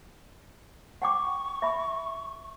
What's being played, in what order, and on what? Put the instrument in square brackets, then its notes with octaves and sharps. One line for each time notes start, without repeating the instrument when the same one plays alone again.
[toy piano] F#5 G5 D6 [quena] C#6
[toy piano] E5 B5